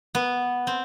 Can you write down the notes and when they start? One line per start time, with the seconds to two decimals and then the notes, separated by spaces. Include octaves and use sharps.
0.15 B3
0.67 C4